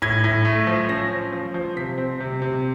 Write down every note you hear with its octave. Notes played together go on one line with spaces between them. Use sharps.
A2 G#6
A2
A3
F3
C#4 A#6
F3
F3
F3
C3 B6
C4
C3
C3